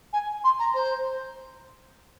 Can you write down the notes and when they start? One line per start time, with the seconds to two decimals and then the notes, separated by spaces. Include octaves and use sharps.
0.13 G#5
0.44 C6
0.59 A#5
0.74 C5